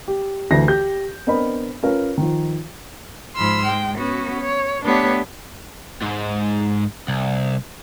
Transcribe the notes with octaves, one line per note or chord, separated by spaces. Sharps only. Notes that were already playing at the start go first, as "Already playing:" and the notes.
G4
D2 E3 A#6
G4 G6
B3 C4 D4 A#4 D#5 B5
C#4 F4 A#4 B4
D#3 F3
G#2 F3 B5 C6 E6 F6
G#3 G5
B3 C#4 F#4
C#5
A3 B3 D4 G4 C#5
G#2
C2